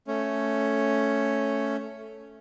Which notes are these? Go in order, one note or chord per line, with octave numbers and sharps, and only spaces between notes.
A3 C#4